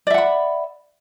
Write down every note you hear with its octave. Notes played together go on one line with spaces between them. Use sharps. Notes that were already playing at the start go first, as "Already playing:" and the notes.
D5 E5 F#5 B5